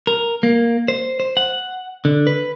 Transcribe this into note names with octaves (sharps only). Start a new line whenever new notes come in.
A#4
A#3
C5
C5
F#5
D3
B4